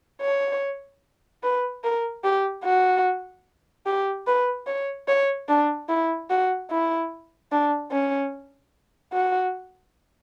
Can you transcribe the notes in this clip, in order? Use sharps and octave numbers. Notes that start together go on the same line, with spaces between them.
C#5
B4
A#4
G4
F#4
G4
B4
C#5
C#5
D4
E4
F#4
E4
D4
C#4
F#4